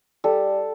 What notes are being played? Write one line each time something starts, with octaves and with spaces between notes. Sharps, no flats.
G3 A4